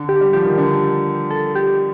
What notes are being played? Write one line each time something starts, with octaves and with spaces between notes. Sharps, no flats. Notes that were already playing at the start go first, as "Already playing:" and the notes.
Already playing: D3
G4
G3
F3 G4
D#3
D3
A4
G4